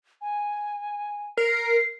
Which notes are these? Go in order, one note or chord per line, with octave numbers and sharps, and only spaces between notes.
G#5
A#4 C7